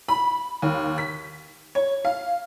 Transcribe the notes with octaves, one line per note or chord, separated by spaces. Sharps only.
B5
D#2
B6
C#5
F5